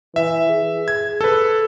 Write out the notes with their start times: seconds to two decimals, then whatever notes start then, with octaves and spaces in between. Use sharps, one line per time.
0.16 E3 E5
0.50 G#4
0.88 G#6
1.21 A4 B4